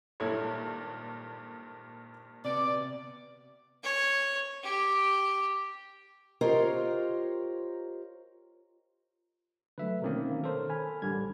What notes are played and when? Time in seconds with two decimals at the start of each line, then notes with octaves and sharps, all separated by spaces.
0.20 G#1 G2 A#2 E4 A4 C#5
2.45 C3 B3 D5
3.83 C#5
4.64 G4
6.41 F4 G4 A#4 C5 C#5 D#5
9.78 D3 F#3 A3 B4 E5
10.02 B2 D#3 A#3 C4 C#4 A#4
10.44 D#3 A4 A#4 C5 C#5
10.70 G#5 B5 F6
11.02 A1 D3 G3 G#6